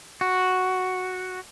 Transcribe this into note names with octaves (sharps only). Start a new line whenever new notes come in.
F#4